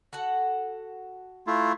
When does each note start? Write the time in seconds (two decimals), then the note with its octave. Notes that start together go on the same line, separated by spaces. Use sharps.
0.13 F#4 A4 F#5
1.47 A3 E4 F4